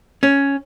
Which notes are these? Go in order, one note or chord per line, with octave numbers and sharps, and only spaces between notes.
C#4